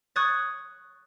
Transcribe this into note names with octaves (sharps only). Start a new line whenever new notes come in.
C#6 D#6 F#6 G#6 A6